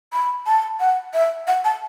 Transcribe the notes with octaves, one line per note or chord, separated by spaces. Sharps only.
B5
A5
F#5
E5
F#5
A5